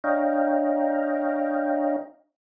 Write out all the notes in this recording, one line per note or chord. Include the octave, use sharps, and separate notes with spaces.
D4 C#5 D#5 F5 G5 A#5